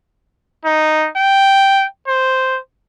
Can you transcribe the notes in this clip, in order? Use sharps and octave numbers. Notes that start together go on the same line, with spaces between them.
D#4
G5
C5